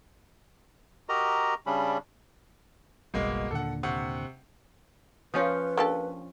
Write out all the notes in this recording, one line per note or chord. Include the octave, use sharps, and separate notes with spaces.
F#4 G4 A#4 D#5 A#5
C#3 G3 C#4 D4 B5
F#1 B1 B2 G3 G#3 A#3
D#2 A#2 D3 A4 F#5
C3 F#5 C#6
F3 C#4 F4 B4 C#5 F5 D#6
A#3 D4 G4 A4 D5 C#6